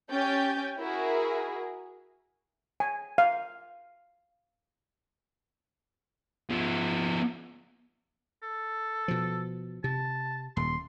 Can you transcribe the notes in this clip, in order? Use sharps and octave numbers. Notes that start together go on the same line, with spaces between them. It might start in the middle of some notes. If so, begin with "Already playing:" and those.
C#4 G4 G5 G#5 G6 A6
E4 F#4 G#4 A#4
G#5
F5
F3 B3
A4
B2 F3
C3 A5
D#1 C6